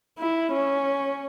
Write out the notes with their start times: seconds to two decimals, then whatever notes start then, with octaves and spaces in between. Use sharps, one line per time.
0.18 E4
0.52 C#4